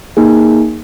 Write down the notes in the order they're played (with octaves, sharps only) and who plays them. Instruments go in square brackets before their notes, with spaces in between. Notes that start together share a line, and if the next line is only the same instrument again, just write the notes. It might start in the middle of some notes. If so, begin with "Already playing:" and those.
[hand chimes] A#3 D#4 G#4